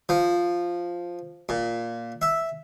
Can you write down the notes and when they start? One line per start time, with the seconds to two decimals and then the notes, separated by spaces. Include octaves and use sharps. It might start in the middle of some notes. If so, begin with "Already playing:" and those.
0.09 F3
1.49 A#2
2.22 E5